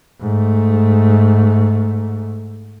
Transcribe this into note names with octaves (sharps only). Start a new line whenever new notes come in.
G#2 A3